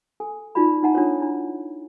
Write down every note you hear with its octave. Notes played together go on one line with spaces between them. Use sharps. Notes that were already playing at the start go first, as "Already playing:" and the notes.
A4 G#5
D#4 F4 F#4 D5 B5
D#4 E4 D#5 F#5 G#5 A#5
D4 F4 F#4 A4 C#5
D4 E4